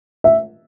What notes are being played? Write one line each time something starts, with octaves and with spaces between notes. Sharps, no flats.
E5